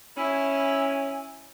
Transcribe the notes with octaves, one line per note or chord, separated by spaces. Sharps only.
C#4 E4 G#5